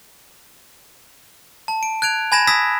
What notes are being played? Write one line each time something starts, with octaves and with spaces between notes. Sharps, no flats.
A5
D7
F#6 G#6 D7 F7
G#5 B5 G#6 A#6 E7
D#6 E6 G#6 A#6 B6